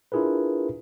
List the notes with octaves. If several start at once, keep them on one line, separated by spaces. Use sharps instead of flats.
D4 E4 F4 G#4 A#4 B4